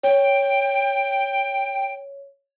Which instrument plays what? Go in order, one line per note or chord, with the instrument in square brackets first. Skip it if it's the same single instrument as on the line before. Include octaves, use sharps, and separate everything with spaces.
[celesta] C#5 [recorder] G5